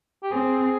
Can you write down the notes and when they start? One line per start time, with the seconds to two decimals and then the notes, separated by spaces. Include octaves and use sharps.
0.23 G4
0.32 C4 G#4